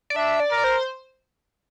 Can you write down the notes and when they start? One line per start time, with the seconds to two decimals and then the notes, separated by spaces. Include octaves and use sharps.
0.10 D5
0.16 D4 E5
0.40 D5
0.51 A#4
0.58 D5
0.64 C5